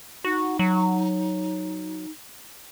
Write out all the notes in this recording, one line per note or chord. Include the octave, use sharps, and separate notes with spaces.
D#4 F#4
F#3